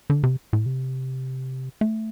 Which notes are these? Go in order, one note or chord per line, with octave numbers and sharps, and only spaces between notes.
D3
C3
A2
C3
A3